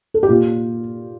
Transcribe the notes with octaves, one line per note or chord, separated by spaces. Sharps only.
A4
G4
A#2 F4